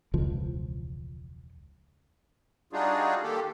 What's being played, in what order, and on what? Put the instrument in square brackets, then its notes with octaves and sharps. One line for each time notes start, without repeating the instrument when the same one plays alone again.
[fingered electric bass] E1 C#2 F3
[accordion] G3 D4 D#4 F4 F#4 G#4
D#3 A#3 G4 A4